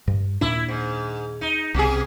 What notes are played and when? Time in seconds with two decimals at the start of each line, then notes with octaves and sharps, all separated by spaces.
0.08 G2
0.41 D#2 A#2 D4 E4
0.68 G#2
1.41 D#4
1.75 C2 B2 G#4